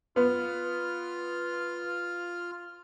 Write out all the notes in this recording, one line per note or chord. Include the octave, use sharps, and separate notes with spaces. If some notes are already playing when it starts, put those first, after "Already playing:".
B3 F4 F6